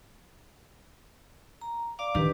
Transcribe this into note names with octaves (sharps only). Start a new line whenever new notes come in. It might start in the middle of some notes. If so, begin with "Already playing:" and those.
A#5
D5 F5 D6
D#3 D4 G4 B4